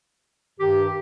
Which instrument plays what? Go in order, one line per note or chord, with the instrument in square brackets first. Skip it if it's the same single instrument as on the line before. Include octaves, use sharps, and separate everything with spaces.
[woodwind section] G2 D#3 G4